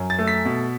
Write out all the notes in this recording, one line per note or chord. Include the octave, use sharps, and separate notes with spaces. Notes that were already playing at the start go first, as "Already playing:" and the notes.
Already playing: F#2
A6
A3
B6
B2